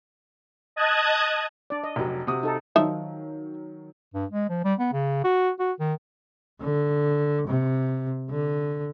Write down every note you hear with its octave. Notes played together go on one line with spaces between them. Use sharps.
D#5 A5 D#6 F#6 G#6
D4 D5
D#5
F1 F#3
C3 F#4 D#6
D#4 A4
D#3 F3 F#3 D#4 E5
G2
G#3
F3
G3
B3
C#3
F#4
F#4
D#3
D3
C3
D3